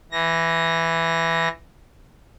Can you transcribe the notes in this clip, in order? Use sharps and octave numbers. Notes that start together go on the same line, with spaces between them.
E3 A#6